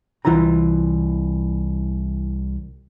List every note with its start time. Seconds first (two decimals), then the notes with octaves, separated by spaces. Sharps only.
0.25 C2 E3 E4 F4 A#5